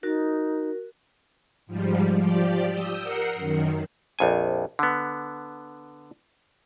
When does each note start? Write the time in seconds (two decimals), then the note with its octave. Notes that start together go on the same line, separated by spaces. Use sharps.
0.03 D#4 F#4 A#4
1.67 G#2 F3 G3
2.15 F3 G4 D5
2.70 D#6 E6 G6
3.00 A#4 F#5 C7 C#7
3.35 F#2 D#3
4.19 A#1 F2 G#5
4.79 D3 B3